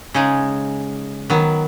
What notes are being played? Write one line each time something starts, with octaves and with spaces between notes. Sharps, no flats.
C#3 G#3 D#4
D#3 F#3 B3